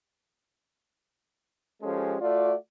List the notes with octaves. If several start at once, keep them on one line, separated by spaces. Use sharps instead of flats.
F3 G#3 C#4 G4 A4
A3 F4 F#4 D5